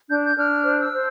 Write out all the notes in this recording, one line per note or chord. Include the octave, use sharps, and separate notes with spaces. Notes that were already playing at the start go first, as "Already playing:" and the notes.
D4 G6
G6
D4 F6
C5
E6
C5